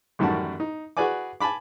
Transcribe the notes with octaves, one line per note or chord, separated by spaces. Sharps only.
A1 F#2 D#3 G3 F#4 A5
D#4
F#4 G#4 B4 D5 G#5 D6
G#5 A5 B5 D6